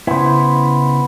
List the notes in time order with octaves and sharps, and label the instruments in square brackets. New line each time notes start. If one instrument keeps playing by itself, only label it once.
[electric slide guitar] C#3 E4 [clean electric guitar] B3 C5